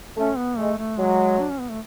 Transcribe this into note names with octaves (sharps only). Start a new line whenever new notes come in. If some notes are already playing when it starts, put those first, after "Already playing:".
A3 C#4
B3
G#3 A3
A3
F#3 G#3
D4
C#4
B3
A3